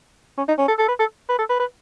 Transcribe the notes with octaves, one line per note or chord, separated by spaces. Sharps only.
C#4
D#4
C#4
A4
A4
B4
A4
B4
A4
B4
B4